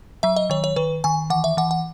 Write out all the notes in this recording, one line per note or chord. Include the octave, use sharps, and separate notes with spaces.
F#3 E5
D#5
D#3 C#5
C#5
D#3 B4
D#3 G#5
E3 F#5
E5
E3 F#5
F#5